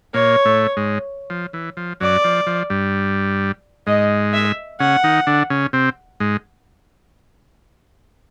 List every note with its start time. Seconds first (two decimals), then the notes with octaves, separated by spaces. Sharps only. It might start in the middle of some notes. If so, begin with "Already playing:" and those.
0.14 A#2 A#3 C#5
0.45 A2 A3
0.77 G#2 G#3
1.30 F3
1.53 E3
1.77 F3
2.00 F#2 F#3 D5
2.24 F3
2.47 F3
2.70 G2 G3
3.87 G#2 G#3 D#5
4.33 E5
4.80 C#3 C#4 F#5
5.04 D#3 D#4
5.27 D3 D4
5.50 C#3 C#4
5.73 C3 C4
6.20 G#2 G#3